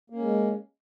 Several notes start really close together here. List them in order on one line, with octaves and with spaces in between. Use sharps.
A#3 C#4 G#3